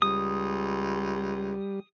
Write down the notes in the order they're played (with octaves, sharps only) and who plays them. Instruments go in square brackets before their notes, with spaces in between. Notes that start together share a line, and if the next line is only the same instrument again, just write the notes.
[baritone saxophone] C#2 [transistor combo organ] G3 [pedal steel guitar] D#6